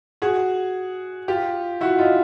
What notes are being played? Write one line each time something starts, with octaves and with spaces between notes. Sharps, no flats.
F#4 G#4
F4 G4
E4 F#4
D#4 F4